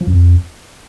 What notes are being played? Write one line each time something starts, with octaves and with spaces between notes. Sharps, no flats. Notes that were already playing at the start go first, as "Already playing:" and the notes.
F3
F#2
F2